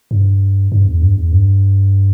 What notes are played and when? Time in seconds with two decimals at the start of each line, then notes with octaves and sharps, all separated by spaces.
0.11 G2
0.72 G2
0.87 E2
1.01 G2
1.16 E2
1.32 G2